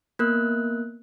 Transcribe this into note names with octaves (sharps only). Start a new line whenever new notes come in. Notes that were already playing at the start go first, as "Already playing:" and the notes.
A#3 B3 A#4 F#6